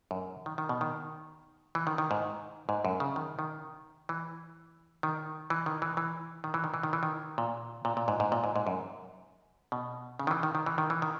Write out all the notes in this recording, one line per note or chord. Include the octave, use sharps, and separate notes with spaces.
F#2
D#3
D#3
B2
D#3
E3
D#3
D#3
G#2
G#2
F#2
C#3
D#3
D#3
E3
D#3
E3
D#3
E3
E3
D#3
E3
D#3
E3
D#3
E3
D#3
A#2
A#2
A#2
G#2
G#2
A#2
G#2
G#2
F#2
B2
C#3
D#3
E3
D#3
D#3
E3
D#3
E3
D#3